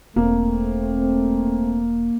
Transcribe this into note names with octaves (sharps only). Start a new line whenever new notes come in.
E1 A3 A#3 C4